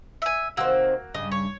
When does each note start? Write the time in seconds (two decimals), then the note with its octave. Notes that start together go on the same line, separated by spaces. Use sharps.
0.22 E5 G#5
0.57 C3 D#3 A#3 C4 F#4 E6
1.15 G2 C#3 D#5
1.32 C#5